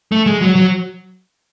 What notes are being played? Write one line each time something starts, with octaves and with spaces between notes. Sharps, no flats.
A3
G#3
F#3
F#3